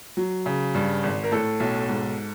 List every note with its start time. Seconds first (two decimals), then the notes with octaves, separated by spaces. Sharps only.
0.17 F#3
0.46 C#3
0.75 G2
1.03 G#1
1.24 A#4
1.32 A2 A4
1.60 B1
1.89 G#2